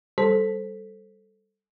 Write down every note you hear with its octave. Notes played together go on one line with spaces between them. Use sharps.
G3 A4 C5 B6